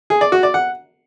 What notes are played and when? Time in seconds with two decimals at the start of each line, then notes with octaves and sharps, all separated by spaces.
0.10 G#4
0.21 D5
0.32 F#4
0.43 D5
0.54 F#5